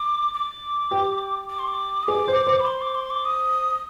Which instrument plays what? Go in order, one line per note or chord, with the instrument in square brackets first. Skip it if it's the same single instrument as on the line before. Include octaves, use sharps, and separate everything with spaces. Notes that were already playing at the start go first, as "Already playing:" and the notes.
Already playing: [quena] D6
D6
[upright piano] G4
[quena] D6
C6
D6
D#6
[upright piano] G#4 [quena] D6
[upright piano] C5
C5
[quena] B5
C6
D6
C6
D6
D#6